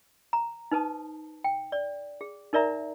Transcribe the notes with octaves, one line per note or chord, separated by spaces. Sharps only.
A#5
D#4 B4 C5 A5 D#6
G5
D5
G#4
D#4 A#4 D5 E5 A#5